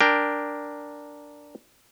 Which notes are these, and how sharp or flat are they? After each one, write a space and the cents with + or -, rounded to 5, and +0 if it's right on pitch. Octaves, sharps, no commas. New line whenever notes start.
D4 +0 A#4 +0 G5 +10